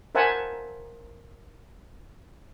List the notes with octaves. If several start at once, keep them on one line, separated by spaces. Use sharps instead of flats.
A#4 C5 E5 F#5 G#5 A5